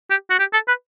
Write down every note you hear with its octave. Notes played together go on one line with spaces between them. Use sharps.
G4
F#4
G4
A4
B4